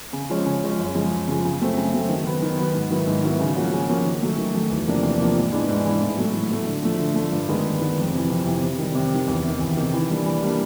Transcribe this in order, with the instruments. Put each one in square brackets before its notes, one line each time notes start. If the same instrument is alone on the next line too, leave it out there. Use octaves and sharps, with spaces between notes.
[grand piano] C#3
F3 G#3 C#4
C#3
F3 G#3 C#4
F#2
C#3 F3 G#3
F#2
C#3 F3 G#3
C#3
F#3 A3 C4
C#3
F#3 A3 C4
D#3
F#3 B3
D#3
F#3 B3
G#2
D#3 F#3 B3 E4
G#2
D#3 F#3 B3 E4
C#3
F3 A#3 C#4 F#4
C#3
F3 A#3 C#4 F#4
D#3
F#3 A3
D#3
F#3 A3
E2
C3 F3 A#3 D4
E2
C3 F3 A#3 D4
G#2
E3 G#3 B3 D4
G#2
E3 G#3 B3 D4
A2
F#3 A3
A2
F#3 A3
D3
F3 A3
D3
F3 A3
G2
D#3 G#3 B3
G2
D#3 G#3 B3
F2
C3 E3
F2
C3 E3
C3
D#3 G3
C3
D#3 G3
E2
C3 D#3
E2
C3 D#3
E3
G3 A#3 D4
E3
G3 A#3 D4